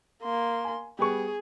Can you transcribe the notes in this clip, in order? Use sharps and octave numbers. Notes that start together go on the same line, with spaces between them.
A#3 C6
G#5
G3 B3 G#4 C#6